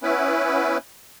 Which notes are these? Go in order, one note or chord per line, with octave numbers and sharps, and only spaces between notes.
B3 C#4 E4 B4